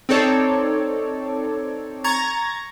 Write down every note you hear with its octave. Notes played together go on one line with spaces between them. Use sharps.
C4 D#4 A4 C#5 D5
A#5 C#6 G#6 A6